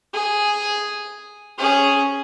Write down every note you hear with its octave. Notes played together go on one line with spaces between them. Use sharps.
G#4
C#4 G#4